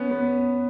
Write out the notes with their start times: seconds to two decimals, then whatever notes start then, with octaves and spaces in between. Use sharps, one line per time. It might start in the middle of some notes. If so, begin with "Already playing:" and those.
Already playing: B3 C#4
0.11 B3